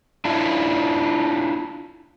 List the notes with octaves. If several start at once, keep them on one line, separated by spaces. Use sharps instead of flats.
D4 E4 F4